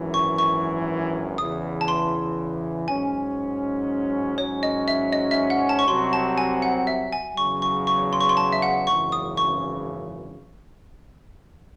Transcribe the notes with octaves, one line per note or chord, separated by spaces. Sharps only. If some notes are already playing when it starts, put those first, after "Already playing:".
Already playing: G#1 F#2 E3
C#6
C#6
E2 C#3 E3 D#6
A5
C6
G#2 F#3 C#4 G#5
G#2 F#3 C#4 C#5
D#5
E5
D#5
E5
F#5
A5
C#6
C2 C3 F#3 C4 F#4 C6
A5
G#5
F#5
E5
G#5
E2 C#3 F#3 C#6
C#6
C#6
C6
C#6
C6
A5
E5
F#5
G#1 F#2 C#3 E3 C#6
D#6
C#6